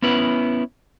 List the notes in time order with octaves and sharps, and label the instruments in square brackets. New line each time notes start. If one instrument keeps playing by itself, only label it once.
[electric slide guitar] B3 C#4 E4 B4